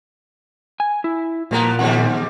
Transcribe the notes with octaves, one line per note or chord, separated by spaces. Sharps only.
G#5
E4
F2 A#2 F3 G3 A#3 B3 A#5
E2 G#2 D#3 G3 B3 F#5